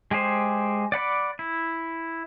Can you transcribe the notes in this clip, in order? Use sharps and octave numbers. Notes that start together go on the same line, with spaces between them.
G#3 G4 G#4 C5
D5 F#5 B5 D6
E4